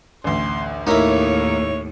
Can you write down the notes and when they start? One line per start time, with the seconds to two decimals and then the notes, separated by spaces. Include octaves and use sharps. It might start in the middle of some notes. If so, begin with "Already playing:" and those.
0.24 A1 D2 C6
0.87 D#2 A2 A3 A#3 D#4 E4 C#5